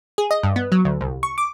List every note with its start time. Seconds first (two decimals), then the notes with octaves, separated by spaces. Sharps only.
0.18 G#4
0.31 D#5
0.43 G2
0.56 B3
0.72 F#3
0.85 D2
1.01 C2
1.23 C#6
1.38 D6